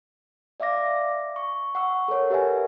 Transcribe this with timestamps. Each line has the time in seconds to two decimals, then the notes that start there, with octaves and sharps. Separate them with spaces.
0.60 D5 E5 F5 D6 A#6
1.36 C#6
1.75 F#5 C#6 E6
2.08 A4 A#4 C#5 F#5
2.30 G4 A#4 B4 E5 F#5 G#5